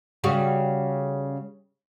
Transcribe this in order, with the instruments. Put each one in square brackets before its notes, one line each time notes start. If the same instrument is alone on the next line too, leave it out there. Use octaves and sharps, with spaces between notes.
[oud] C#3 G3 F#4